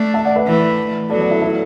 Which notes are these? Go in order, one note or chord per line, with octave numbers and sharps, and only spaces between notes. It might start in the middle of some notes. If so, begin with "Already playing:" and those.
Already playing: A3 D4
E5 A5
D5 F#5
B4 E5
E3 A3
F#3 B3 A4 D5
A4 D5
E4 A4
E4 A4